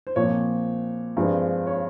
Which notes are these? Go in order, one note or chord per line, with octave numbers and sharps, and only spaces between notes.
C5
A#2 F3 C4 C#5
G2 F3 G#3 C4
C#5